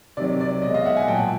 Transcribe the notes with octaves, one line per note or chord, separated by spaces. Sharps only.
C3 D#3 F#3 D5
D5
B2 G#3 D#5
D#5 F5
E5 F#5
F#5 G#5
A#2 F#3 G5 A5